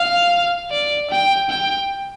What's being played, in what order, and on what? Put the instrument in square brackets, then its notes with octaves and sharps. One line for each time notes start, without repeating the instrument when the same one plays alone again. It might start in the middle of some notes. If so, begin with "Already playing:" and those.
Already playing: [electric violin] F5
D5
G5
G5